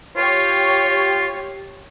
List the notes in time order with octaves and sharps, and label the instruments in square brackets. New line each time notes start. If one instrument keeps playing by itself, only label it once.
[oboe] F4 [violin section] G4 C#5